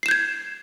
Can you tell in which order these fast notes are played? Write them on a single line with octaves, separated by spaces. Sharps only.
C7 E7 G6 G#6